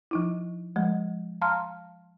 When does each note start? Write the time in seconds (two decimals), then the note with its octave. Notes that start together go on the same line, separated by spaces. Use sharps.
0.11 F3 D#4 E4
0.76 F3 G#3
1.41 F5 A5 A#5 C6 F6